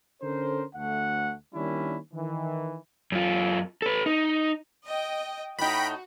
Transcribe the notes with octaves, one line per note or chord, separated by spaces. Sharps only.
D3 C#4 A4 A#4 C5
D2 A3 F#5
D#3 G3 A#3 C#4 D4 E4
D#3 E3
F#2 F4
A4 B4
D#4
D#5 G5
A2 D#4 F#4 G5 B5